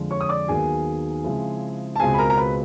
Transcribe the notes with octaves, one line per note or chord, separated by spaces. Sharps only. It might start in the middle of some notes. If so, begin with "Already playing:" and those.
Already playing: F2 D3 F3 G#3
C#5 C#6
D#6
D5 D6
D#2 D#3 F#3 B3 D#4 G#4 G#5
C#3 F3 G#3 C4 E4
A5
C#2 B2 G#3 C4 G#4 G#5
B5
A#4 A#5
A#5
B4 B5